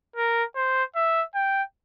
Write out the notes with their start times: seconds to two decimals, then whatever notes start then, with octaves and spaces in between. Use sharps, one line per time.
0.16 A#4
0.56 C5
0.96 E5
1.35 G5